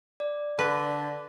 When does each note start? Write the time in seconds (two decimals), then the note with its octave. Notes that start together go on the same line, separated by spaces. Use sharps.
0.20 D5
0.59 D3 B4